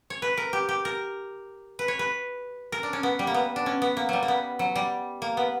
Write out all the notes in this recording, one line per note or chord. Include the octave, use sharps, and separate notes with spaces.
C#5
B4
A#4
G4
G4
A#4
B4
C#5
B4
A#4
D4
C#4
B3
G3
A#3
B3
D4
C#4
B3
A#3
F#3 G3
A#3
B3
F#3
G3
A#3
B3